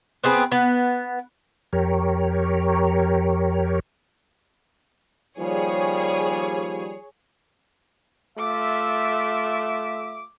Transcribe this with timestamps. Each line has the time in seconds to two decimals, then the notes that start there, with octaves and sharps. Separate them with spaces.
0.24 B3 C4 G#4 B4
0.52 B3
1.73 F2 G4 A#4 C#5
5.37 D#2 F3 G3 G#4 C#5
8.39 A3 F4 E5 D6